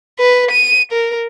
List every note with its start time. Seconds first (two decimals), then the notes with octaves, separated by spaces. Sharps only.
0.19 B4
0.51 D#7
0.92 A#4